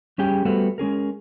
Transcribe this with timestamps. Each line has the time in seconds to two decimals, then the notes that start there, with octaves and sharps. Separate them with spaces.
0.18 G3 C#4 G4 G#4 G5
0.45 G3 A3 B3 F#4 A4 C5
0.78 G#3 C#4 G#4 A#4